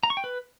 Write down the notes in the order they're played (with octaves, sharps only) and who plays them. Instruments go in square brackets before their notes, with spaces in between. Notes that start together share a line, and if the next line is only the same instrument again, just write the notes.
[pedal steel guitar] A#5
C#6
G5
B4